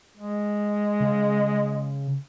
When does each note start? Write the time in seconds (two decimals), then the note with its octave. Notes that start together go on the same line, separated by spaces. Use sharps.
0.17 G#3
1.00 C#3